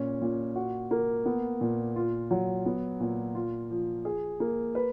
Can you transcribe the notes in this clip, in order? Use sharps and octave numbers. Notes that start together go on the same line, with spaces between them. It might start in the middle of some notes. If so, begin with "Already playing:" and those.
Already playing: A#2 C#4
A#2
F#4
A#3
B3
A#2
F4
F#3
B3
A#2
F4
F3
G#4
A#3
B4